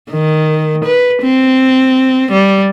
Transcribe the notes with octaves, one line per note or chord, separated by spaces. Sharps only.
D#3
B4
C4
G3